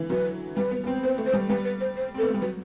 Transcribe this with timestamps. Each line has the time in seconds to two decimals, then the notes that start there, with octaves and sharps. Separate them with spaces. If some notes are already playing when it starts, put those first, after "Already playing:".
Already playing: D3 E3
0.10 F#3 B4
0.57 G3 B4
0.71 B3
0.84 B3
0.87 C4
1.03 B3 C5
1.18 A3
1.26 C5
1.33 G3
1.49 G3 B4
1.65 B4
1.80 C5
1.96 C5
2.14 C4
2.18 A4
2.21 B3
2.28 A3
2.34 G3
2.42 F#3 B4